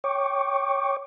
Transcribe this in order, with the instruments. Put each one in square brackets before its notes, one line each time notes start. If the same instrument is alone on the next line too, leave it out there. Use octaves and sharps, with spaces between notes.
[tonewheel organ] C#5 G5 C#6 D6